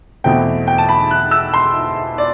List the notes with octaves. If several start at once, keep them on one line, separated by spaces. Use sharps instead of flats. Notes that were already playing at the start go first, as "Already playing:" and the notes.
E2 B2 A3 C4 G5
G5
A5
B5
F#6
E6
C6
D5